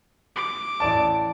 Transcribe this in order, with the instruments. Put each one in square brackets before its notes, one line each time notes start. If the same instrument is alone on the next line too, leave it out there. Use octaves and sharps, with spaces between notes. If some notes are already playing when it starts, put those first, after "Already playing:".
[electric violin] D6
[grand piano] A1 D5 A5